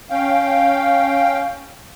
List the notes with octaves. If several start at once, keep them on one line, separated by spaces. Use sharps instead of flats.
C#4 F5 G5